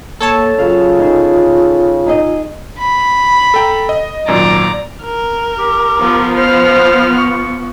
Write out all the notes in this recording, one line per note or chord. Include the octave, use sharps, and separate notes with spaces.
A#3 A4 C#5 A5
C#3 F#3 F4 F5
D#4 G#4
D#4 G#4 D#5
B5
A4 G5 A#5
D#5
G#1 F#2 A#2 D5 A#5
A#4
G4
F3 B3
C5 F6
C#6